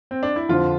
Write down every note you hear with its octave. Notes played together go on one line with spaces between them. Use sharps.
C4
D4
E4
F2 D3 F3 F4